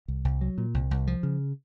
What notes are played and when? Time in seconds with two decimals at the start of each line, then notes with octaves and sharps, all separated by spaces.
0.08 C2
0.25 C2
0.41 F#3
0.58 A#2
0.74 C2
0.91 C2
1.07 F3
1.23 C#3